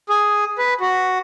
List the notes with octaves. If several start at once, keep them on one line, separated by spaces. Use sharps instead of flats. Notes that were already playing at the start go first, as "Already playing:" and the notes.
G#4
B4
F#4